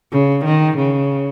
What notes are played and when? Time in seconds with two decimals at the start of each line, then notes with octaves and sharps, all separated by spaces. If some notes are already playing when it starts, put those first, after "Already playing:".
0.12 C#3
0.44 D#3
0.77 C#3